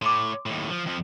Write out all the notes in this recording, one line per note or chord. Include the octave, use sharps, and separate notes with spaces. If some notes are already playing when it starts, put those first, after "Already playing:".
A2 C6 D6
D#2 A2
F3
F2 F3